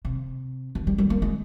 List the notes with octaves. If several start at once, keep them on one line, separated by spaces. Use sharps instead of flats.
C3
D#3
G3
G3
A#3
G#3